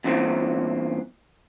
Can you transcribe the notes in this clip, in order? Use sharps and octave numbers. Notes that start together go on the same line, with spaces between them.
E2 G2 A#2 E3 C4